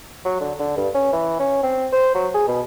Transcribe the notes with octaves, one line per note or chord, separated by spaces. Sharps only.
F#3
D3
D3
G2
C#4
E3
C#4
C4
C5
F#3
G#4
B2